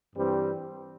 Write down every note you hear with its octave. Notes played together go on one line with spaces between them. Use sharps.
G2 E3 G3 C4